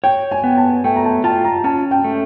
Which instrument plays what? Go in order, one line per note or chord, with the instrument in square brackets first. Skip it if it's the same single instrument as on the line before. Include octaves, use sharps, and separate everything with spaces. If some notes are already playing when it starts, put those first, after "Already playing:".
[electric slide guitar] C#5 [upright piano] G5
[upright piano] G#5
[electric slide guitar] B3
[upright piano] A5
[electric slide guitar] A3 [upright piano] G5
[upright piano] A#5
A5
[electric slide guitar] F4 [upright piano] A5
[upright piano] A#5
[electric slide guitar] C#4 [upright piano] A5
[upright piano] G5
[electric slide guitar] A3